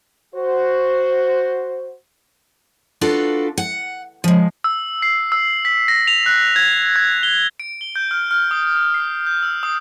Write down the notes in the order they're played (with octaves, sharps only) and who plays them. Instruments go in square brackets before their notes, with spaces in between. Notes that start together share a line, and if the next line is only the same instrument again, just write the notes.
[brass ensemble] F#4 C5
[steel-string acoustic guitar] D4 F4 F#4 A4 B4
F#5
F3 G#3
[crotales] E6
C7
E6
B6
A#6
F7
F#6
G#6
G#6
G7
D7
G7
G6
F6
F6
D#6
D#6
C7
G6
E6
D#6